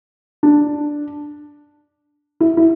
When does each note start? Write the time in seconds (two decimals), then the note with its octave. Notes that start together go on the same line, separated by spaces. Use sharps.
0.43 D4
2.40 E4
2.57 E4